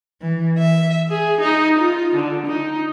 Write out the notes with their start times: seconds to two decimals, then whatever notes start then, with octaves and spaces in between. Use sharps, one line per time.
0.21 E3
0.59 E5
1.10 G#4
1.40 D#4
1.78 F4
2.15 D3
2.46 D#4